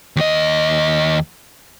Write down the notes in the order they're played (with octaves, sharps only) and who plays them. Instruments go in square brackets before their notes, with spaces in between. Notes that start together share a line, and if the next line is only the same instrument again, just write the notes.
[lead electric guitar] D#2 D#5